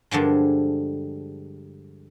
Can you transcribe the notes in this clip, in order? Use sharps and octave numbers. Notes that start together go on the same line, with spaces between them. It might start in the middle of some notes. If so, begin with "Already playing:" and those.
G2 D3 F3 G#3